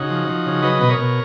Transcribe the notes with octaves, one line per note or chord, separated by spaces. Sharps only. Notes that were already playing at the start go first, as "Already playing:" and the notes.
Already playing: C#3 D#4 F#4
F3
F3
C#3
F#3 B4 D#5
B2
A#4 C#5
B2